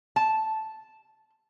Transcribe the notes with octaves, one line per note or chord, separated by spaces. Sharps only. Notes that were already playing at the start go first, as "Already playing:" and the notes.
A5